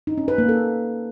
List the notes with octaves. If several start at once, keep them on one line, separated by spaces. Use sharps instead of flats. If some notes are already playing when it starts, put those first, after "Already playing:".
D#4
C#4
B4
A#3
A4